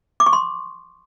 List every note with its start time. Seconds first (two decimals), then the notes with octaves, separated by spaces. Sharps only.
0.20 D6
0.26 C#6
0.33 C6